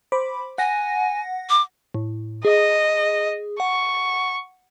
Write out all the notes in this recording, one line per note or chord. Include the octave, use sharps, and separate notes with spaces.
C5 B5 D6
F#5 G#5 A#6
D6
A2
G#4 D#5
F#5 C#6